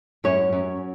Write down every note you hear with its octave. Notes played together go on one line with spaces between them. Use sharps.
F#2 C#4 C#5
F#2